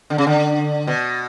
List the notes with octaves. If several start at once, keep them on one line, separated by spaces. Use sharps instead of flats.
D3
C#3
D3
B2